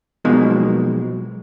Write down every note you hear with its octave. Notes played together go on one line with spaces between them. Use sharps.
B1 B2 F3 G#3 A#3